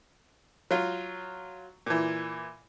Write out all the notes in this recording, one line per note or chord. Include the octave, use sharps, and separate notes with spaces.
F#3 F4
A#2 E3